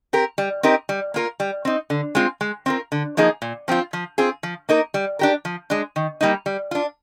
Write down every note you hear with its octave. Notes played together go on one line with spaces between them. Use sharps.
C4 G4 A#4
G3
C4 D#4 G4 A#4
G3
A#3 F4 A#4
G3
C4 D#4
D3
G#3 C4 F4
G#3
C4 F4 A#4
D3
F3 A#3 D#4 G#4
A#2
F3 C4 F4
F3
C4 F4 G#4
F3
A#3 D#4 A#4
G3
D4 G4 A#4
F3
G#3 D4
D#3
G3 A#3 D#4
G3
D4 F4